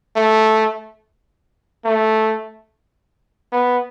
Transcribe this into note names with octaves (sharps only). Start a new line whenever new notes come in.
A3
A3
B3